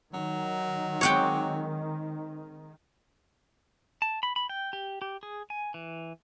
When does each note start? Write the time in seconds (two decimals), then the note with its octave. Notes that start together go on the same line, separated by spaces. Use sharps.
0.13 D#3 F#3
1.01 G#3 C4 C#5 F#5 G5 D6
4.02 A5
4.23 B5
4.36 B5
4.49 G5
4.73 G4
5.02 G4
5.23 G#4
5.50 G#5
5.74 E3